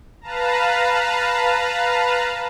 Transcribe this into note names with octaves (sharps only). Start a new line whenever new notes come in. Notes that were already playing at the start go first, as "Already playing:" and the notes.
B4 F5 A5 A#5